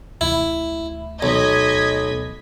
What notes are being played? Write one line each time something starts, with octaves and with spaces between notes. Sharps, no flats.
D2 E4
B1 D#5 G#6 B6